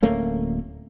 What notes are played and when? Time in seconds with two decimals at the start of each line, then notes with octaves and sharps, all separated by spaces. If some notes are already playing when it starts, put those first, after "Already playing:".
0.03 D1 A3 A#3 C#4